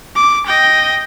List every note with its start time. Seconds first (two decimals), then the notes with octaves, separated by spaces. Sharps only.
0.16 D6
0.46 D#5 G5